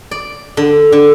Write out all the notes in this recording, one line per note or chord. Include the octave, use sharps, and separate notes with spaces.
D5
D3
D3